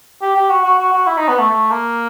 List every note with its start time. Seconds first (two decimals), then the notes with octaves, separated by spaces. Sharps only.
0.22 G4
0.36 G4
0.50 F#4
0.65 F#4
0.79 F#4
0.93 F#4
1.07 E4
1.18 D#4
1.28 B3
1.39 A3
1.50 A3
1.71 A#3